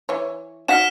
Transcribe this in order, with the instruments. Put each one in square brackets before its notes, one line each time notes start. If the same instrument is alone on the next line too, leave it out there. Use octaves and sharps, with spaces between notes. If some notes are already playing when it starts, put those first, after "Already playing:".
[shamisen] E3 C#5
[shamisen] D#4 F#4 F#5 [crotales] F6 B6 E7